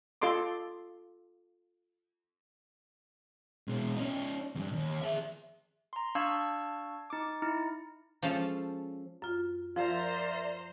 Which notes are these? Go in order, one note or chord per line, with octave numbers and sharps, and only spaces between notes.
F4 A4 D#5 C6 D6
B2 G#3
C#4 D#4
E2 G2
D#2
G#4 E5
A#5 C6
D4 F5 A5 C#6 E6 G#6
D#4 D6
D#4 E4
F3 G#3 C#4 A4 F5 A5
F#2 F4
F3 F4 A#4 C5 D5 E5 A#5 C6